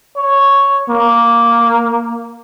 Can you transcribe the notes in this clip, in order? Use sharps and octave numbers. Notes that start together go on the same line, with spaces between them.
C#5
A#3